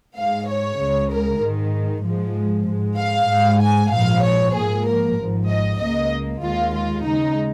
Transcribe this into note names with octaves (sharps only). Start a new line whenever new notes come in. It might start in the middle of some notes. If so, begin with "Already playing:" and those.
G#2 G#3 F5
C#5
C#2 C#3 G#3
A#4
G#2 D#3 G#3
G#2 F3 G#3
G#2 G#3
F5
G#2 G#3
G#5
A#1 G#2 F3 F5
C#5
G#2 F3 A#3 G#4
A#4
G#1 G#2 F3
D#5
C#2 C#3 A#3 D#5
D#2 D#3 G#3 F4
F4
D#2 C#3 G#3 D#4